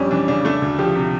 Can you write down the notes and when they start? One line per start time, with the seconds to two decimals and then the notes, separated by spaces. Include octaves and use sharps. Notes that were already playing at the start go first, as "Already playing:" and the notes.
Already playing: F2 G3 C#4 D4
0.11 E3 D4
0.28 C#3 D4
0.45 A3 D4
0.62 D2
0.79 F3 G4
0.96 C3